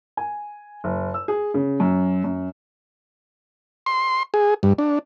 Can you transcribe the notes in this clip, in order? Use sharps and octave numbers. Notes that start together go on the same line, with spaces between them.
G#5
F#1
E6
G#4
C#3
F#2
F#2
C6
G#4
G2
D4